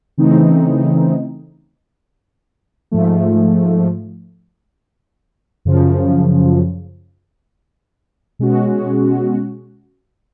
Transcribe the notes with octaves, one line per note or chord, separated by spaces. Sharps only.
C#3 E3 A3 C4 D#4
G#2 F3 A3
F#2 C#3 F3
B2 G#3 C#4 F#4